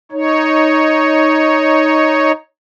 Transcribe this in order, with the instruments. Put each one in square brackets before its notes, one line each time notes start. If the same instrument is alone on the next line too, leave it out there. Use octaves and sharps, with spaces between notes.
[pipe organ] D#4 C#5